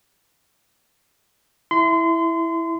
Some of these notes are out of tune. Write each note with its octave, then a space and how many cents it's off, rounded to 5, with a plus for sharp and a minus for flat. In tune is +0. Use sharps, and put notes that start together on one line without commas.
E4 +0 C6 -30